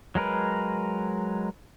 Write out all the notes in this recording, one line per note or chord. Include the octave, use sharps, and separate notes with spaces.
F#3 G#3 A#4 B4